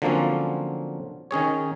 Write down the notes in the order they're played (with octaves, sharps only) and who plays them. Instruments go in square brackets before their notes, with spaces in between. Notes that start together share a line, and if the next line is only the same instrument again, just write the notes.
[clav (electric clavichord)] D3 F3 F#3 A#3 C4 C#4
D#3 C#4 G#4 C#5